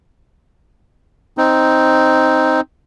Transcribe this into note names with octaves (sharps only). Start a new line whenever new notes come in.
C4 D#4